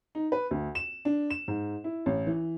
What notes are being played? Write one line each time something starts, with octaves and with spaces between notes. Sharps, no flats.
D#4
B4
D2
E7
D4
E7
G#2
E4
A1
E3